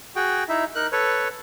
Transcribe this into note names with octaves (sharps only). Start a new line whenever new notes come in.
F#4 G#4 G5
D#4 E4 E5
D#4 A#4 F#6
A4 B4 C#5